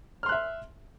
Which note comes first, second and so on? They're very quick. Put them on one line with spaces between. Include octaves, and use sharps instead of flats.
F6 C6 F#6 E5